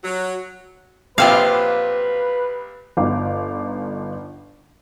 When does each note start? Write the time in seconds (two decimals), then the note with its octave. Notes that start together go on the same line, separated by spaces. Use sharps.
0.04 F#3
1.18 A#1 C3 F#3 C4 F4 B4 F5
2.97 G1 D#4 F5 D6